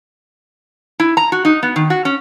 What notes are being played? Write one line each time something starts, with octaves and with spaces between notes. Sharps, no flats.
E4
A#5
F#4
D#4
B3
D#3
F#4
C#4